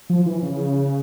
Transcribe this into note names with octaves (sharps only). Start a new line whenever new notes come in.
F3
E3
C#3